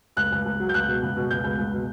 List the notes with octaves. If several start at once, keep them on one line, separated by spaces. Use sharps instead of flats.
C#2 F#6
C#2
C#2
F#3
G6
C#2 F#6
B2
C#2
B2
C#2 G6
C#2
C#2
B2